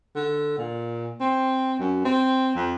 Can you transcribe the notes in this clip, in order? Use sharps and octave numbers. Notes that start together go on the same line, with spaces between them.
D3
A#2
C4
F#2
C4
F2